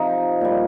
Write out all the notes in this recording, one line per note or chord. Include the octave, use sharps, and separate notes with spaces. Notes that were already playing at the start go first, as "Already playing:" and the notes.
Already playing: C3 F3 D#4
A#2 G3